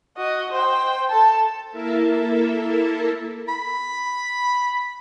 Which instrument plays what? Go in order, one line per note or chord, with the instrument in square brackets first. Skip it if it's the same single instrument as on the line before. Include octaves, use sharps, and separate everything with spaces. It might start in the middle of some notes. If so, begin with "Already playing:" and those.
[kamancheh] F#4 D#5
C5 G5
A4 A5
[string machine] A#3 E4 A4 A#4 E5 A5
[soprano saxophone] B5